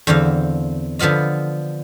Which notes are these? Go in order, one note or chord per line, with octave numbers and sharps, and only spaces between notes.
E2 D3 C4 F5
D3 F3 B3 F4 D#5